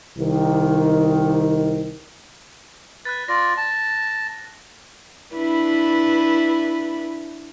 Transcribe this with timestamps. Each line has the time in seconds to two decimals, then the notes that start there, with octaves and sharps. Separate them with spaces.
0.19 C2 D#3
3.05 B4 F#6 A6
3.28 F4 D5 A6 A#6
3.57 A5
5.35 D4 E4 B4